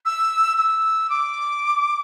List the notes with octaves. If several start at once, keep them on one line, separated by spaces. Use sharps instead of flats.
E6
E6
D6